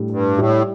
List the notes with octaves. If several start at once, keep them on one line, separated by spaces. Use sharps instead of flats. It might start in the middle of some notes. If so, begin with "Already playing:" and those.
Already playing: A2 G3 D4 G4
G2
A2 G3 E4 G4